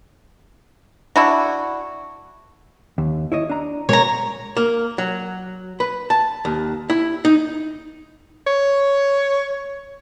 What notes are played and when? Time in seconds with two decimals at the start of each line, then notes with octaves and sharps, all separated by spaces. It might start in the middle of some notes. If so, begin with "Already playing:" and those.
1.16 D4 E4 F#4
2.98 D#2
3.32 E4 C#5 D#5
3.49 D4 A#5
3.89 B2 G#3 A#4 C#5 A#5
4.57 A#3
4.98 F#3
5.80 B4
6.10 A5
6.45 D#2
6.90 E4
7.25 D#4
8.47 C#5